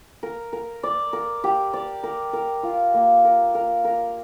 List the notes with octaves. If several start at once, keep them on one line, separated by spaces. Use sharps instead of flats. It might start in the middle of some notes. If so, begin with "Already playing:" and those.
A#4
A#4
D5
A#4
G4
D5
A#4
A#4
F4
A#3
A#4
A#4
A#4